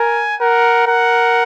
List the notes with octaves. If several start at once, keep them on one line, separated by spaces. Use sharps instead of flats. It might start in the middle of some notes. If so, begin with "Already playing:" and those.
Already playing: A#4 G#5
A#4 F#5
A#4 F#5